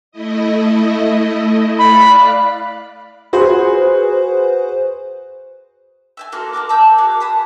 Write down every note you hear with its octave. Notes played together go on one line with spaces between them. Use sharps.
A3 E4 D#5
D5 F5 B5 F#6
F#4 G#4 B4 C5
E5 G5 G#5
A#3 F4 F#4 A4
A#3 F#4 A#4 D6
A5 D6 E6 G6
F#4 G#4 A#4 D6
G#5 A5 B5 D#6